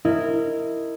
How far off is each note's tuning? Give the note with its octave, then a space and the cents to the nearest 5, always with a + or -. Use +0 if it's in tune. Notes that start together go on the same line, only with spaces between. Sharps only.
E4 +5 A#4 -20 D#5 +0